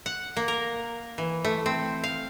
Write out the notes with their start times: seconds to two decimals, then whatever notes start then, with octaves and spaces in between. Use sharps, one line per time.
0.06 F#5
0.37 A#3
0.48 A#4
1.18 E3
1.45 A3
1.66 C4
2.03 F5